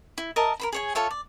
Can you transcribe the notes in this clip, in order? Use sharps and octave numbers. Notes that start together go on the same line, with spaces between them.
E4
A#4 D#5 E5 A5
A#4 C5 B5
G#4 C#5 G#5
F4 A4 C#5 E5
D5